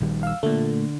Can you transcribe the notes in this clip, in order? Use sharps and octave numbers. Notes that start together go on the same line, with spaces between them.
A#1 D#3 G3
F5 E6
A#2 D3 A3